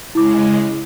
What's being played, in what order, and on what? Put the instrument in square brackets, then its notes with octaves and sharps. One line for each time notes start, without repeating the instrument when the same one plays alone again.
[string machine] C#3 G#3 [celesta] E4 D6